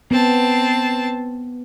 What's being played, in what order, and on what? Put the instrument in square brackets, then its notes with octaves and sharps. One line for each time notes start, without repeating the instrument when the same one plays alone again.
[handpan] B3 [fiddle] C4 A5